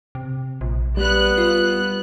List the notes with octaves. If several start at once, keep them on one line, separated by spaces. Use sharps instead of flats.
C3
A#1
G3 B3 F#6
F4